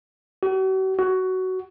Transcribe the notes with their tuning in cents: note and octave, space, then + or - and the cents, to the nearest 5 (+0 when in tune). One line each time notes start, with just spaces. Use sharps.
F#4 +45
F#4 +15